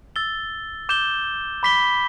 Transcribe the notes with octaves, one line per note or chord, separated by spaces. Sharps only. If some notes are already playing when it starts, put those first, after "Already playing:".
E6 A6 G7
D6 G6 E7 G7
B5 D6 B6 G7